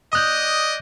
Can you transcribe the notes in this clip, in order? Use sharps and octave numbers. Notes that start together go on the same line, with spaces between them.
D5 D#5 D#6 F#6 G6